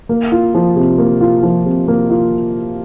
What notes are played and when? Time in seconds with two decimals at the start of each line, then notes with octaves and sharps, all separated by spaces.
0.09 A#3
0.32 F4
0.55 F3
0.76 C3
0.98 A#3
1.21 F4
1.43 F3
1.65 C3
1.88 A#3
2.10 F4